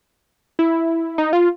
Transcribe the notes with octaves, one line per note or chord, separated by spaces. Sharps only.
E4
D#4
F4